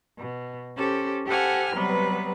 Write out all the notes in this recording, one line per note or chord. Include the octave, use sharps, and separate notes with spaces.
B2
C#4 G4 A4 C5
G4 A4 C5 F#5 G#5 F6
C3 F#3 G3 B3 B4